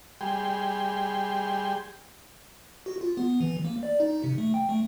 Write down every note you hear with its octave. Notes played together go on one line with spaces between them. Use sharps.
G3 G#4 G5 C6
F#4
F4
B3
E3
A#3
D5
D#4
C3
A3
G5
A3